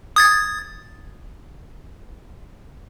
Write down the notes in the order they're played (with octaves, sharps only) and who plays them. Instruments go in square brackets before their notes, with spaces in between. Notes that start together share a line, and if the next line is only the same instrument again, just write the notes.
[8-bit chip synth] D#6 G#6 A6